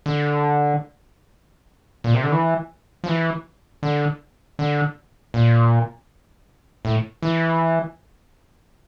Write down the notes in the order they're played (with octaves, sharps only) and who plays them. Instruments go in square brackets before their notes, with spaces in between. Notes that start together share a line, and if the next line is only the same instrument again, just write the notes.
[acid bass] D3
A#2
C3
D3
E3
F3
E3
D3
D3
A#2
A2
E3